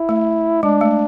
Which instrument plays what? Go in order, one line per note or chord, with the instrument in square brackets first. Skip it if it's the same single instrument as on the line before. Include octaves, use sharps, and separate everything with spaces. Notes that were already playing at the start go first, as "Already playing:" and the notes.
Already playing: [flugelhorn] E4
[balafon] A3
[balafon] G#3 [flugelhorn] D4
[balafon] A3